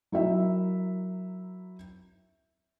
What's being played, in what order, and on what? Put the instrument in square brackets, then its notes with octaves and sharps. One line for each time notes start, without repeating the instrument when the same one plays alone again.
[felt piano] F#3 E4 A#4 E5